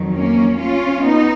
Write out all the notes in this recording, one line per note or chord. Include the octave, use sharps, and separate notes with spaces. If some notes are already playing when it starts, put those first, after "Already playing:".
Already playing: F2 D#3 F#3
A#3 C#4
C#4 F4
B3 D#4